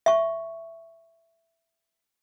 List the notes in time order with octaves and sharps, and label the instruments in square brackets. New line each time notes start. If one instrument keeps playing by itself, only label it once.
[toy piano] E5 C#6